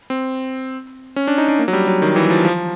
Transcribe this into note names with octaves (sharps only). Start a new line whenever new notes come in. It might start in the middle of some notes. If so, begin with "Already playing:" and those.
C4
C#4
D4
D#4
D4
A#3
F#3
G3
F#3
D#3
E3
F3
F3